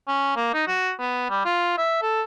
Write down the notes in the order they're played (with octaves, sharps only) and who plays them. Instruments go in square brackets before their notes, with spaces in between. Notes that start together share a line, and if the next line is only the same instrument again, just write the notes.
[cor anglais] C#4
A#3
D#4
F#4
B3
G3
F4
E5
A4